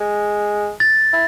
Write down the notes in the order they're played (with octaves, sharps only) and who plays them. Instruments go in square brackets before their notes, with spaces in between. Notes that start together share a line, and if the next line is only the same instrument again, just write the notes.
[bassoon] G#3
[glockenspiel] A6
[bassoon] E4